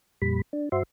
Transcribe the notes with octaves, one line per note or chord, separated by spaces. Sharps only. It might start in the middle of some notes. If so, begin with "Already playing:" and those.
F2 A#2 G3 B5
D4
G2 F#4 C5 E5 C6